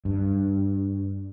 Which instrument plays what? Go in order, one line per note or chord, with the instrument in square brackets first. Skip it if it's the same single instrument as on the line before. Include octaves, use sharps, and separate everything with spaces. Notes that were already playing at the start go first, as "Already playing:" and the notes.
[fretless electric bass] G2